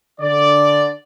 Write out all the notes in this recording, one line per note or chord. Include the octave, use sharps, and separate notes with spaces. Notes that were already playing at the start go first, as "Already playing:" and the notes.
D3 D5